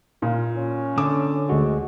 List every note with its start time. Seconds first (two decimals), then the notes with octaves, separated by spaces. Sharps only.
0.22 A#2 F4
0.57 C#4
0.98 D3 D6
1.49 D2 G#3 F#4